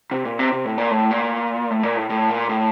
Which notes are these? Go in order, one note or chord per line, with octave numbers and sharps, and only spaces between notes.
C3
A#2
C3
C3
A2
A#2
A2
A#2
A2
A#2
A2
A2
A#2
A2